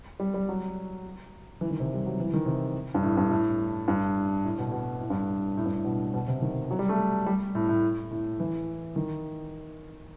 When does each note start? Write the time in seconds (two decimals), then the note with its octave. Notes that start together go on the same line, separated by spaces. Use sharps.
0.20 G3
0.34 G3
0.49 F#3
1.61 E3
1.70 D#3
1.80 C3
1.94 G3
2.06 F#3
2.20 E3
2.34 D#3
2.46 C3
2.95 G2
3.03 A2
3.17 G2
3.31 A2
3.88 G2
4.44 A2
4.58 B2
4.72 B2
5.01 A2
5.10 G2
5.57 A2
5.66 G2
5.76 A2
5.85 B2
6.14 B2
6.28 C3
6.42 D#3
6.71 F#3
6.79 G3
6.89 A3
7.26 G3
7.55 A2
7.69 A2
8.11 A2
8.40 E3
8.96 D#3